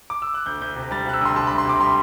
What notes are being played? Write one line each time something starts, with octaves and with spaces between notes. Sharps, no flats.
D6
E6
F#6
D2 G6
D2 G6
C3
G3 A6
C3 F#6
E6
D2 C6
C3 A5
G3 B5
C6
C3 D6
G3 C6